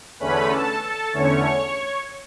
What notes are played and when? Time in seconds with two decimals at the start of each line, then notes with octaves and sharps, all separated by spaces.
0.19 E2 D3 A3 C#4 B4 B5
0.51 A4 A5
0.82 A4 A5
1.13 E2 D3 A3 C#4 C#5 C#6